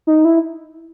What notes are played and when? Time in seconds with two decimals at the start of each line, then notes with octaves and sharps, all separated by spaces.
0.07 D#4
0.25 E4